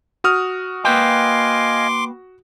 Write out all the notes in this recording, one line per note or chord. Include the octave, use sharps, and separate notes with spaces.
F#4 D#6 F6
A#3 B4 D#5 F5 G5 G#5 C6 D6